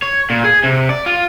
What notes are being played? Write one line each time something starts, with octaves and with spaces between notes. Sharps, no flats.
C#5
A#2
G#4
C3
D5
F4